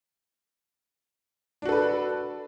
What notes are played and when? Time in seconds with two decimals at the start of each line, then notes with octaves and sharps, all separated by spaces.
1.62 D4
1.65 F#4
1.69 A4
1.72 B4